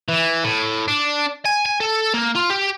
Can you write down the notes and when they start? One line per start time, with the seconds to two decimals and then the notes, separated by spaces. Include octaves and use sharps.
0.09 E3
0.44 A2
0.88 D4
1.46 G#5
1.66 G#5
1.80 A4
2.14 A#3
2.35 F4
2.50 G4